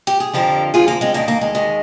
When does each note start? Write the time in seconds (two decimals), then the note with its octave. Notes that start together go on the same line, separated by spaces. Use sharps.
0.07 G4
0.20 G#4
0.33 F2 D3 F3 G4 A#4
0.74 F2 D3 F3 F4 G#4
0.88 A#3
1.01 G#3 C4
1.14 D#2 D#3 A#3 D4
1.28 A#3
1.41 G#3
1.55 D#2 D#3